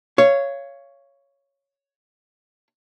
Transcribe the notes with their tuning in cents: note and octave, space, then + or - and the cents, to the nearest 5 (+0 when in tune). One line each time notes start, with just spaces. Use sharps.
C#5 +5 F5 -25